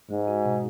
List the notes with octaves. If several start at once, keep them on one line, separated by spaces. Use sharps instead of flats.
G#2 G#3
F#4
B2